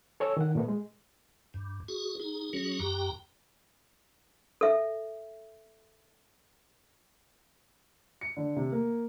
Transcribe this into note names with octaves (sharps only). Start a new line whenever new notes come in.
A4 C#5 G#5 E6
D#3 F#5
A#2 A3 B3
G#3
G2
F#4 G#4
D#4 G#4
F#3 C#4 F#4 G#4
F#2 G4 G5 A#5
A4 E5
C#7
D3
C3
A#3